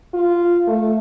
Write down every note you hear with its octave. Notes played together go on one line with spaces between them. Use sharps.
F4
A3